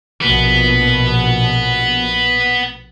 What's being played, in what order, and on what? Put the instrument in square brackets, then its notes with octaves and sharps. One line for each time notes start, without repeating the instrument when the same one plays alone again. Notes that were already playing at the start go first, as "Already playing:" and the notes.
[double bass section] A#1 B2 [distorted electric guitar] B3